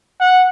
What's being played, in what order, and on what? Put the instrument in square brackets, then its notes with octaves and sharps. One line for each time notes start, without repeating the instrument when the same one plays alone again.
[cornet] F#5